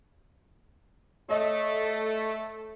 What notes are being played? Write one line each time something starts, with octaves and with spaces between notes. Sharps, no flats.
A3 C#5 D#5